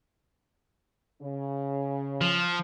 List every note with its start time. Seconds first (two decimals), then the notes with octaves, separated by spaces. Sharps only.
1.21 C#3
2.21 F3